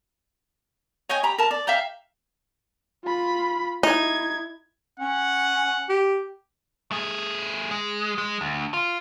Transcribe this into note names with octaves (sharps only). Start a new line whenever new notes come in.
C#5 D#5 G5 G#5
G4 A#5 B5
A#4 A5
D5
E5 F5 G5 A#5
F4 B5
D#4 E4 G#6
C#4 F#5
G4
A3 G#4
G#3
G#3
D2
F4